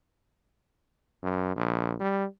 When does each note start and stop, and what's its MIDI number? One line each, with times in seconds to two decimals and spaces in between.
1.23 1.51 42
1.56 1.95 34
2.00 2.25 55